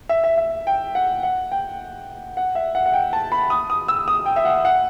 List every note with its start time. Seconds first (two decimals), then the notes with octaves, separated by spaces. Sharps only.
0.09 E5
0.24 E5
0.38 E5
0.67 G5
0.95 F#5
1.23 F#5
1.52 G5
2.37 F#5
2.55 E5
2.75 F#5
2.86 F#5
2.94 G5
3.13 A5
3.32 B5
3.50 D#6
3.70 D#6
3.88 E6
4.08 D#6
4.26 G5
4.36 E5
4.45 F#5
4.65 F#5